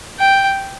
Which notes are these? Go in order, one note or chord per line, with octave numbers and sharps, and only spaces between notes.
G5